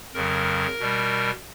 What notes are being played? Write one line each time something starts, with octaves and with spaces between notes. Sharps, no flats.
F2 C#3 F#3 A#4
B2 G3